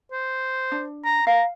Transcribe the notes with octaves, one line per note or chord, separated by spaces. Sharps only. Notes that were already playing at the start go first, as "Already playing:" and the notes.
C5
D4
A#5
F5 A#5